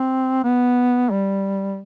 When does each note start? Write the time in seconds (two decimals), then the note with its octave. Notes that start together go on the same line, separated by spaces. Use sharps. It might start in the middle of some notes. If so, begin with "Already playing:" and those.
Already playing: C4
0.44 B3
1.11 G3